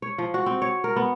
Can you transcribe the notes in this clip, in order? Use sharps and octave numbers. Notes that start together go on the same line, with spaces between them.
C#5
F3
F#4
C4
C#5
A#4
B3